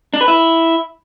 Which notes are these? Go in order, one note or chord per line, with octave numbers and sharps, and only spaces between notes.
D4
B4
E4